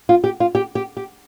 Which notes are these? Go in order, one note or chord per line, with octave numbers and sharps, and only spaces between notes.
F4
G4
F4
G4
G4
G4